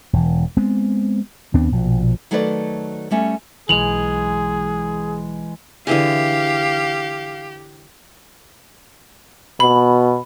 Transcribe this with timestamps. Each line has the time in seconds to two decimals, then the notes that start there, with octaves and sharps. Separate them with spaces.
0.13 E1 E3
0.57 G#3 B3 C4
1.54 D#2 B3 C4 D4
1.72 A#1 B2 F3
2.31 D#3 F#3 A3 F#4 B4 D5
3.11 G3 A3 C#4
3.69 B1 E3 G#3 G#4 F7 F#7
5.87 D3 E3 G4 G#4 F5
9.60 B2 B5